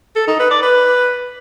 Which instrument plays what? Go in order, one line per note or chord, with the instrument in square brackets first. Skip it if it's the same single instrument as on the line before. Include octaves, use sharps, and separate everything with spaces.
[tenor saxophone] A4
D#4
B4
D5
B4